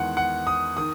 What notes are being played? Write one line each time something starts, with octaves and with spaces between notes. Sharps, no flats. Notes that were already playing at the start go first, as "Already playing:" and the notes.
Already playing: E2 D#3 G#3 F#5
F#5
D#6
D#3 D#6